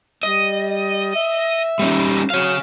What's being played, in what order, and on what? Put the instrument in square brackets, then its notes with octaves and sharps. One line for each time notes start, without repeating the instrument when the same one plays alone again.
[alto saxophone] G3 [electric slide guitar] D#5
[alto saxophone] E5
[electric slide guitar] G3 C#4 D#4
[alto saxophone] F#3 [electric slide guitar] C#5 F5